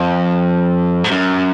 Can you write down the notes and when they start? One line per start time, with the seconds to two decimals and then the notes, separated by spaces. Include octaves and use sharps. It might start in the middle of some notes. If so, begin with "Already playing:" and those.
Already playing: F2
1.04 G#2
1.11 F#2